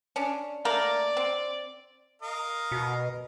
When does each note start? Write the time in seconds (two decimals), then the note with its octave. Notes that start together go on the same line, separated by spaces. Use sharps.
0.16 C#4 D4
0.65 A3 A#3 A#4 D5
1.17 C4
2.22 A#4 D#5 F5
2.72 B2